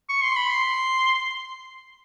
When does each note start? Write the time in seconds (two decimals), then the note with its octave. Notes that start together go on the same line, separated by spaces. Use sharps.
0.09 C#6
0.23 C6
0.36 B5
0.50 C6